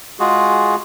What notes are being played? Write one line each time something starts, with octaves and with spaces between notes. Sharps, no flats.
G#3 F4 F#4 G#4